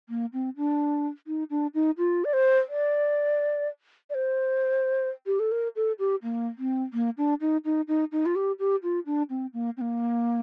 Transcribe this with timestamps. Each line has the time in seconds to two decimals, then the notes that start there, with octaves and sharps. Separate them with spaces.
0.09 A#3
0.33 C4
0.57 D4
1.27 D#4
1.50 D4
1.74 D#4
1.98 F4
2.25 D5
2.33 C5
2.69 D5
4.10 D5
4.15 C5
5.26 G4
5.40 A4
5.52 A#4
5.76 A4
5.99 G4
6.23 A#3
6.58 C4
6.93 A#3
7.18 D4
7.41 D#4
7.65 D#4
7.88 D#4
8.12 D#4
8.26 F4
8.36 G4
8.59 G4
8.83 F4
9.06 D4
9.30 C4
9.54 A#3
9.77 C4
9.81 A#3